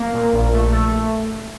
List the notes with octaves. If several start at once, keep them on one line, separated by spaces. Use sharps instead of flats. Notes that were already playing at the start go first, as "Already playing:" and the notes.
Already playing: A#3
A#2
A#1
A3
A3